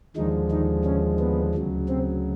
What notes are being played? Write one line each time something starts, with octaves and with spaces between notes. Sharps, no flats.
D#2 D3 D#3 F3 G#3 D#4
D#3 D#4
C#3 C#4
B3
D2 C#3 F#3
C3 C4